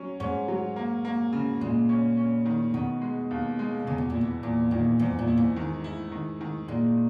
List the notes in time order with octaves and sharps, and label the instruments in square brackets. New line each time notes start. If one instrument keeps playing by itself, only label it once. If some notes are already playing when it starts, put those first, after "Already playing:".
Already playing: [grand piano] F#3 C#4
[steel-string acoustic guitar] G#2 [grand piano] C#4
[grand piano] F#3
A#3
A#3
C#3
[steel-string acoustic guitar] A#2 [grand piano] G#3
[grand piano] C#4
C#4
D#3
[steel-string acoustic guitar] B2 [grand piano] D#3
[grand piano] G#3
D#2
G#3
[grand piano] E2 [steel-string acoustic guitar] C#3
[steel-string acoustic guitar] B2
A#2
[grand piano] E4
[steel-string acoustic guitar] B2
[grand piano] E2 [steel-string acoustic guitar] A#2
[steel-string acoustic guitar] A#2 [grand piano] D#3
[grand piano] E2 [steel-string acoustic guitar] G#2
[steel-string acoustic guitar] A#2
[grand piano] E4
[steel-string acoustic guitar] G#2
[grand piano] D#3
E4
D#3
D#3
[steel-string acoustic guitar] A#2 [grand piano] G#3